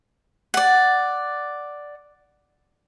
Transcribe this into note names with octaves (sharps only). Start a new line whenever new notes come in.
D5 F#5